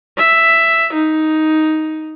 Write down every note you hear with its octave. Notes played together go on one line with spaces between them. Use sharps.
E5
D#4